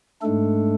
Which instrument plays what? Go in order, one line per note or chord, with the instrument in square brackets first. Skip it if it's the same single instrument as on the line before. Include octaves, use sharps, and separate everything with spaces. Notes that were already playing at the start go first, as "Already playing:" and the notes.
[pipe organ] G#2 G#3 A3 D4 A4